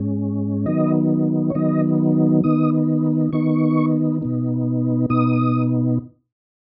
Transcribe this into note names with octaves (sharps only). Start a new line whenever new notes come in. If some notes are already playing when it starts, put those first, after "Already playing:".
Already playing: G#2 G#3 C#4
D#3 F#3 B3 D#4 D#5
C#5
D#3 F#3 B3 D#4 D#5
D#3 B3 D#4 D#6
D#3 B3 D#4 C#6
B2 B3 D#4
B2 B3 D#4 D#6